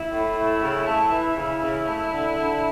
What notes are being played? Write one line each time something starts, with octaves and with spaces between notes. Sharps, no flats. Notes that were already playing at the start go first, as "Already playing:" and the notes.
Already playing: E4
A2
A3
C#3
A3
E3
C#3
C#3
A3
D3
D3